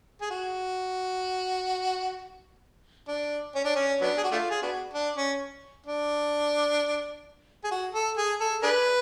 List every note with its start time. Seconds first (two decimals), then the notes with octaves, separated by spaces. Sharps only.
0.22 G#4
0.31 F#4
3.08 D4
3.55 C#4
3.65 D4
3.76 C#4
4.01 F#3 B3 D4
4.18 G#4
4.24 F#4
4.32 A3 D4 F4
4.51 G#4
4.62 B3 D4 F#4
4.94 D4
5.16 C#4
5.86 D4
7.64 G#4
7.71 F#4
7.94 A4
8.17 G#4
8.40 A4
8.63 D4 G#4 B4